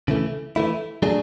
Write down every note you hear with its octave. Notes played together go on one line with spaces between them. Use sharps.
C#3 E3 A3
E3 A3 E4
F#3 A3 D4 G#4